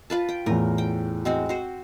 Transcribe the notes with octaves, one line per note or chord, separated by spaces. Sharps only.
F4 B4 A5
G5
E2 A2 A#4
G5
G#3 C4 F#4
F#4 C5